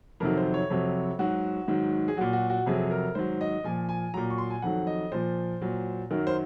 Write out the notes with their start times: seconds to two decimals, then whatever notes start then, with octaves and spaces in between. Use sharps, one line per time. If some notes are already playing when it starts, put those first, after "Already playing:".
0.20 F2 C3 D#3 F#3 A#4
0.37 C5
0.54 C#5
0.70 F2 C3 F#3
1.19 G#2 F#3 F#4
1.68 G#2 D#3 F#3
2.08 G#4
2.17 A#2 F#3 F#4
2.33 F#4
2.50 F#4
2.66 F2 C3 F#3 G#4
2.91 A#4
3.15 G#2 D#3 F#3 C5
3.41 D#5
3.64 A#2 F3 G#5
3.89 G#5
4.14 A#2 F#3 A#5
4.30 C#6
4.38 C6
4.50 G#5
4.62 F2 D#3 F#3 F#5
4.87 D#5
5.12 A#2 F3 C5
5.61 A#2 F#3
6.11 F#2 D#3 F#3 A#4
6.27 C5